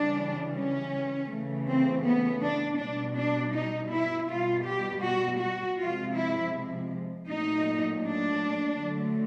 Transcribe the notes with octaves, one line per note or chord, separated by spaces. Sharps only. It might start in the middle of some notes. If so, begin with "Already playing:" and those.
Already playing: C#3 E3 G3 D4
C#4
C#3 E3 A3
C4
B3
D4
B2 G3 D4
D4
D#4
E4
B2 G3 F4
G4
F#4
F#4
C3 F3 G#3 F4
E4
A#2 F#3 A3 D#4
D4
D3 F#3 A3